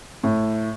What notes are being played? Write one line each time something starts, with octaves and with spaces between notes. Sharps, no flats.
A2